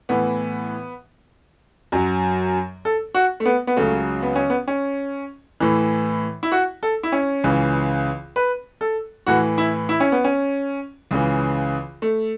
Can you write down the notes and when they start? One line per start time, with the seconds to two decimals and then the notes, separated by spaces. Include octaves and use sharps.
0.09 A2 E3 B3
1.92 F#2 F#3
2.85 A4
3.15 F#4
3.40 A3
3.45 B3
3.67 B3
3.77 C#2 C#3 F#3 A3
4.23 B3
4.36 C#4
4.50 B3
4.68 C#4
5.60 A2 E3
6.43 E4
6.52 F#4
6.83 A4
7.03 E4
7.12 C#4
7.44 C#2 C#3 E3
8.36 B4
8.81 A4
9.27 A2 E3 F#4
9.58 E4
9.89 E4
10.00 C#4
10.12 B3
10.24 C#4
11.11 C#2 C#3 E3
12.02 A3